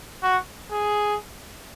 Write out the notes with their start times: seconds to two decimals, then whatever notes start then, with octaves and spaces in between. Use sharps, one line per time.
0.23 F#4
0.72 G#4